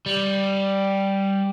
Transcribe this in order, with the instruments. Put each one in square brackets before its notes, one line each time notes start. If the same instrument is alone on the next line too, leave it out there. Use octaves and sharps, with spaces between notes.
[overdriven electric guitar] G3